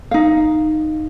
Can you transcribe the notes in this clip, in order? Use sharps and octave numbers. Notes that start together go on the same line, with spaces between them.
D#4 F5